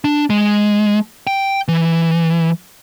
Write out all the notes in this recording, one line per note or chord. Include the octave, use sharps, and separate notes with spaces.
D4
G#3
G5
E3